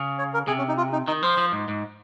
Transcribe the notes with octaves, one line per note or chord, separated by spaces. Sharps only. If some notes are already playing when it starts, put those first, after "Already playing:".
Already playing: C#3
C#5
A#4
C3 G#4
C#4
D#4
F4
D#4
D#3 D#4
F3 C5
F3
G#2
G#2